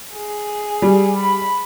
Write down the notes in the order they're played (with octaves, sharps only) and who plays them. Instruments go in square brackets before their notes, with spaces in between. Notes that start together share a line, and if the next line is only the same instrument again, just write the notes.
[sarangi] G#4
[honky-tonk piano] G3
[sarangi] B5